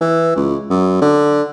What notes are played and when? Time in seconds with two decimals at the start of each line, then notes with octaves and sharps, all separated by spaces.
0.01 E3
0.36 C#2
0.70 F#2
1.01 D3